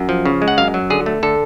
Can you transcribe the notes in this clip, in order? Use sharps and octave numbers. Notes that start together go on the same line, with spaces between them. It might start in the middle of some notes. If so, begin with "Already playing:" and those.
Already playing: F#2
F3
C#3
G#3
F#5
F#2 F5
F#3
D3 G#4
A3
D3 A4